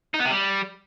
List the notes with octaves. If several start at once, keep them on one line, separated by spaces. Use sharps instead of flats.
D#4
B3
C3
G3